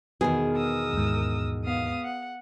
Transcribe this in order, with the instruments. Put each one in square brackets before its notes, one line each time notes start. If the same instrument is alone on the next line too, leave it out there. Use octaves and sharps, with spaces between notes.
[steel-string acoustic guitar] E2 B2 D#3 [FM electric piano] B3 [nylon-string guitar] G#4
[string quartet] A#4 D#6 E6
[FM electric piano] D#2 G#2
[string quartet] B3 F5 D#6
F#5